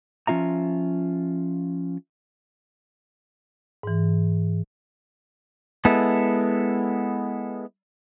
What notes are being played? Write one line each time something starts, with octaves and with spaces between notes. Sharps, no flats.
F3 C#4 F4 E5 A#5
G#2 E3
G#3 B3 E4 A4